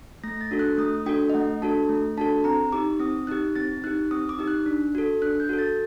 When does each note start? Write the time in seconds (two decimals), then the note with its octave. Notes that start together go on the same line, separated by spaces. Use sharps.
0.24 A3 A#6
0.41 A6
0.51 D4 F#4 A4
0.59 F#6
0.78 A3 D#6
1.06 D4 F#4 A4 G5
1.30 D#5
1.34 A3 F#5
1.62 D4 F#4 A4 A5
1.89 A3
2.17 D4 F#4 A4 A5
2.44 C4 A#5
2.72 D#4 G4 D6
3.00 C4 D#6
3.27 D#4 G4 F#6
3.55 C4 A6
3.84 D#4 G4 F#6
4.11 C4 D#6
4.29 D6
4.39 D#4 G4
4.47 F#6
4.66 D4
4.95 F#4 A4
5.22 D4 F#6
5.40 G6
5.49 F#4 A4
5.59 A6